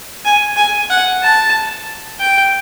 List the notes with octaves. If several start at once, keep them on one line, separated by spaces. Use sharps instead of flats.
G#5
G#5
F#5
A5
G5